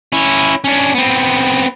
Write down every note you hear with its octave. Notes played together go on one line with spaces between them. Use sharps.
C#4 E4
C#4 D4
B3 C4